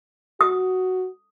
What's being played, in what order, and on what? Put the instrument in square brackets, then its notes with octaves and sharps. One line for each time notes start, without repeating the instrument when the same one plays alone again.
[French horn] F#4 [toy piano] D#6